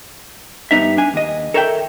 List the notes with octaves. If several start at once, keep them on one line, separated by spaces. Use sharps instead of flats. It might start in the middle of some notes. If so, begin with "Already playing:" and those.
G2 C3 B3 D#4 E5
D4 G#5
D#2 D#5
A4 A#4 C#5 E5 F#5 G5